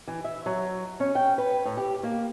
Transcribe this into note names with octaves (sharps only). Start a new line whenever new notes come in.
E3
E5
F#3
C#4
G5
B4
A2
G4
A#3